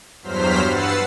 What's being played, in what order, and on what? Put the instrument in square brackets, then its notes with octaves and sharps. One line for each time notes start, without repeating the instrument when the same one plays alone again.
[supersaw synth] E2 G2 F#3 C5 F6 B6
G2 B4 F#5 E6 A6 C7